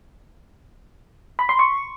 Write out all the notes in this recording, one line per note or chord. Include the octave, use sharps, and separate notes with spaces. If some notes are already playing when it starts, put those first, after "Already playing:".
B5
C6
C#6